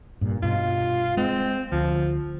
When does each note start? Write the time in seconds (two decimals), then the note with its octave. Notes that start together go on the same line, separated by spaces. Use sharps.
0.21 G2 A#2
0.43 G2 B2 F4
1.17 G#3 C4
1.72 D2 F3